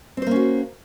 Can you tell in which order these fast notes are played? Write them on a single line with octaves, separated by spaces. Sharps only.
C4 C5 A#3 C#4 F#4